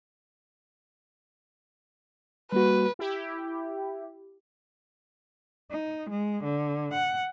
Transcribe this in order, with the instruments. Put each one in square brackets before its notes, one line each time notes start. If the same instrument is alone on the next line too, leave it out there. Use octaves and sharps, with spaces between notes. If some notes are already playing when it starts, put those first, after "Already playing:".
[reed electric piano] G3 A#3 F#4 [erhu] B4
[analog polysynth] E4 G4
[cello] D#4
G#3
D3
F#5